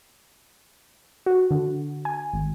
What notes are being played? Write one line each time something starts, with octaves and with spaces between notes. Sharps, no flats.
F#4
D3
G#5
G#1